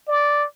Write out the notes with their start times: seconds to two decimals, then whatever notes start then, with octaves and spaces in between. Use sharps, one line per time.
0.08 D5